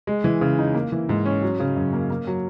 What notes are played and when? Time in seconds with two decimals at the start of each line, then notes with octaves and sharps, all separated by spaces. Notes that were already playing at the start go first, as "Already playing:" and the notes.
0.07 G#3
0.24 E3
0.41 C#3
0.59 D#4
0.74 A#3
0.92 E3
1.09 G#2
1.26 C#4
1.43 F#3
1.60 C#3
1.76 F#2
1.93 A#3
2.10 A#3
2.27 F#3